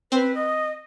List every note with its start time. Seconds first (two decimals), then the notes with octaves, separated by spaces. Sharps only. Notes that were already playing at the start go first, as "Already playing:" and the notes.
0.12 C4 B4
0.35 D#5